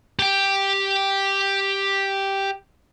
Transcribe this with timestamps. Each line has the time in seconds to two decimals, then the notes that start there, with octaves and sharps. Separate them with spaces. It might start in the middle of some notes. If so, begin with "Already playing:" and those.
0.19 G4 G5